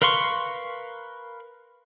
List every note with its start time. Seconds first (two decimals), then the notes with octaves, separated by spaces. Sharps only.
0.02 A#4 B4 F5 C6 C#6